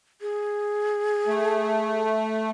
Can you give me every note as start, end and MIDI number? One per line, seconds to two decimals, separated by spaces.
0.21 2.02 68
1.27 2.51 57